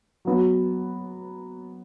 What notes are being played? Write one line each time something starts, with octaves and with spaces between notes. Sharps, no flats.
F#3 B3 F#4